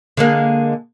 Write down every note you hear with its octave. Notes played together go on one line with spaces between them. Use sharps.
D3 G#3 A#3